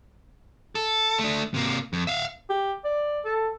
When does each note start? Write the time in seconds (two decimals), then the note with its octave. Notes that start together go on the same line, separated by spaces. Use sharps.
0.75 A4
1.19 A3 D4
1.54 C3 A#3
1.93 F2
2.07 E5 F5
2.50 G4
2.85 D5
3.25 A4